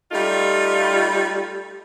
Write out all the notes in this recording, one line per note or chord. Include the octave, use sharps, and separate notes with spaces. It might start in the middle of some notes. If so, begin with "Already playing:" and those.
G3 A3 D#4 F4